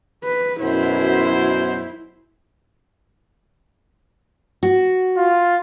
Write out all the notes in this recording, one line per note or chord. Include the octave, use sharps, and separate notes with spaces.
B4
F#2 B2 E4 C5
F#4
F4